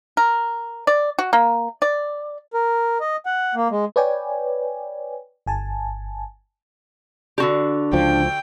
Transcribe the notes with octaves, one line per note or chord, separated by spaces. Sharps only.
A#4
D5
F#4
A#3
D5
A#4
D#5
F#5
A#3
G#3
B4 C#5 D5 G5 G#5
G1 G#5 A5
D3 D4 F#4 G4
C#2 F3 G5